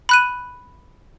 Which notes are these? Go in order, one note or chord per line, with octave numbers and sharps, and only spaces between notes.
B5 F#6 D#7